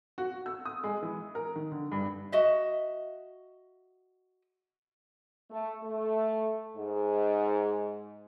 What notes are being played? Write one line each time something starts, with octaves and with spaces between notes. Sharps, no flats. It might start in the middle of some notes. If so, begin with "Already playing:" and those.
F#4
E6
D#6
G#3
E3
A#4
D#3
D3
G2
F#4 D#5 E5
A3
A3
G#2